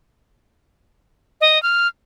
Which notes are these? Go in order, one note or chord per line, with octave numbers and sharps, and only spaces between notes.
D#5
F6